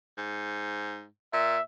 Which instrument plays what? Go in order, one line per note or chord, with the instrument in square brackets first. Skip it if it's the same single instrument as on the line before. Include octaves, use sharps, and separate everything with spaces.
[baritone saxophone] G#2
[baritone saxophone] A#2 [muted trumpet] E5